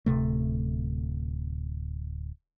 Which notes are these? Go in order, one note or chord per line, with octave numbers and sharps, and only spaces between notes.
D1 C3 A3